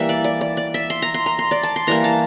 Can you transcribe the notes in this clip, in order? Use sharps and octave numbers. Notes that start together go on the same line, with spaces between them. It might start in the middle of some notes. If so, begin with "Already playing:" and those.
Already playing: E3 G3 A#3 E5
D5
D5
D5
D5
E5
C6
A#5
C6
A#5
C6
D5
A5
C6
E3 G3 A#3 A#5
A5